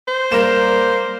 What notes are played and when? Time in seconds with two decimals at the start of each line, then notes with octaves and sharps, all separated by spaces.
0.08 C5
0.32 G3 A#3 A#4 E7